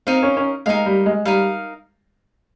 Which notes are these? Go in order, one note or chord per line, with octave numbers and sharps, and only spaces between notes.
C4 D#4 A#4 F5
C#4
C#4
G#3 D#4 A#4 F5
G3
G#3
G3 D#4 A#4 F5